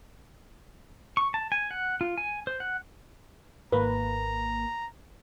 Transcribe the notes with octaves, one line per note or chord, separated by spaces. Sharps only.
C#6
A5
G#5
F#5
F4
G#5
C5
F#5
G#1 A#3 B4 A#5